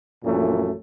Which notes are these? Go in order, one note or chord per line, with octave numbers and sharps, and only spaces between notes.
A#1 F#2 A#2 E3 A3